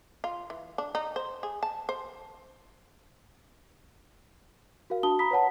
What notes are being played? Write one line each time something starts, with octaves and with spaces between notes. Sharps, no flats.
F4
E3
D4
D#4
C5
G#4
A5
C5
F#4 A#4 F5
D4 F#4 A5 D#6 G7
A#5 B5 D#6 B6
B4 C#5 F#5 A5